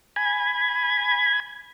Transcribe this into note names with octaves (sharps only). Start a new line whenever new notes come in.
G#5 B5 G#6